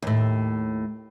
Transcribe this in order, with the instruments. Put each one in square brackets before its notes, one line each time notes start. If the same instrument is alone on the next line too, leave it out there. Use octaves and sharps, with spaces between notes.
[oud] D#2 A2